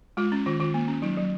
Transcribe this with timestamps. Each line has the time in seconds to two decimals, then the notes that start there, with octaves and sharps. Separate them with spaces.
0.17 G#3 F4
0.32 C#4
0.46 D#3 F4
0.60 D#3 F4
0.74 A#3
0.88 C#4
1.02 F#3 D#4
1.17 F#3